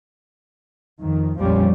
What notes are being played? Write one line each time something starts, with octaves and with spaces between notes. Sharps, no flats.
F2 D#3
A#1 F2 F3 G3 C#4